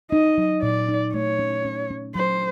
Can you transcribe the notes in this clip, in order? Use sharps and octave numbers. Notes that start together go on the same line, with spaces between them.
D#4 D#5
F#3
A#2 D5
D#4
A3 C#5
C#4
C#4
C#4
F#3 C5